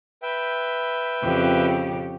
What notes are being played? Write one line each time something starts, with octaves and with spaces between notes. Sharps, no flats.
B4 E5 G5
F2 C#3 G4